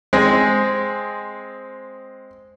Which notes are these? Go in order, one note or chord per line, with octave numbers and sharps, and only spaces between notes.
G#3 C4